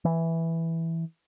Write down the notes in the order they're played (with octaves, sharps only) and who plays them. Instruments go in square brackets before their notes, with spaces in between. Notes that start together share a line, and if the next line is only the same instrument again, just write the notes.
[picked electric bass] E3